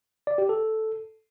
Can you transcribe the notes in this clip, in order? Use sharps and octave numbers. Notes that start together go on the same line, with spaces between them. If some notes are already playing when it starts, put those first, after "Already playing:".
D5
G4
A4